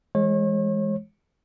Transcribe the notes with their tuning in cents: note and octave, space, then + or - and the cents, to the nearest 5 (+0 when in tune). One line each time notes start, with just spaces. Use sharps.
E3 +10 G#3 +0 C#5 -35